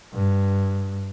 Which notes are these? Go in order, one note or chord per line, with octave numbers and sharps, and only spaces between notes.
G2